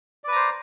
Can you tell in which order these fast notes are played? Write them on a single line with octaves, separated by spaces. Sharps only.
D5 B4 A#5 C5